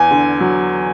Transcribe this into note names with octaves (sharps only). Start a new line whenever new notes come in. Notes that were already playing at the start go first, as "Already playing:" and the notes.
Already playing: E2 G#5
D3
F#3